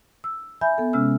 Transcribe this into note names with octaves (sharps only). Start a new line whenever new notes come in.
E6
E5 G#5 B5 G6
B3 A4
C3 G#3 C#4 E6 F6